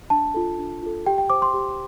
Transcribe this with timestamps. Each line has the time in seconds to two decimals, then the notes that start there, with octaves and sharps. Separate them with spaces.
0.10 D4 A5
0.34 F4 A4
0.59 D4
0.83 F4 A4
1.06 G4 G5
1.18 G5
1.30 C5 D6
1.42 C6
1.54 G4